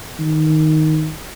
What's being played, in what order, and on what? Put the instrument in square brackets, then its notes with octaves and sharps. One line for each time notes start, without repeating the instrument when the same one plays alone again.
[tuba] D#3